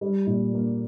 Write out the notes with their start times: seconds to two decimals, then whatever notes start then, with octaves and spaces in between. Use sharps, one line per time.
0.01 G3
0.27 A#2
0.54 A#3